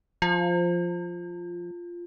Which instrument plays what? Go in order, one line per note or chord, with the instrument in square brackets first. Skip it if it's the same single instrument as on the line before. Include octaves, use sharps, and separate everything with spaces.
[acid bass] F3 [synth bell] F4